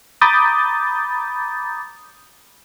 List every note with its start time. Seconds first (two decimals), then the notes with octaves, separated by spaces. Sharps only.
0.21 A#5 B5 D6 D#6 G6 A6